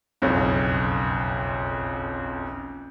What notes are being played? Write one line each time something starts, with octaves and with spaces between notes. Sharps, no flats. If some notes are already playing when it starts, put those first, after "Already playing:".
F#1 B1 F2